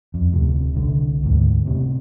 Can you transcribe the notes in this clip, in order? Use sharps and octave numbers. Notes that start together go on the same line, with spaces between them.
F2
D1 A2 C3
C2 D3
D2 G#2
A2 C3